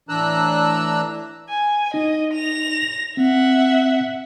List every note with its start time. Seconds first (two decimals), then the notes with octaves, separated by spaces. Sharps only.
0.09 A2 E3 D4 A#5 E6 F#6
1.49 G#5
1.94 D#4 D#5
2.34 A#6 F7
3.17 C4 E5 F#5